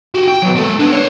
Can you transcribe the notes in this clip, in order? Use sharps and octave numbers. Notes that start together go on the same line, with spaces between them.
F#4 G4
G5
F#3 B3
G#3 A4
B3 D4
C5 C#5